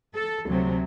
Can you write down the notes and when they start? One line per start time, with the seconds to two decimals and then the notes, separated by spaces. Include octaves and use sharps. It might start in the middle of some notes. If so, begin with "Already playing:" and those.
0.14 A4
0.46 D2 C3 F#3 A3